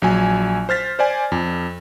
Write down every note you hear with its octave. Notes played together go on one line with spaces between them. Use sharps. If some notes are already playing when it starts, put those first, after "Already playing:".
A#1 F#3 G#5
C5 F6 A6 B6
C5 D5 G#5
F2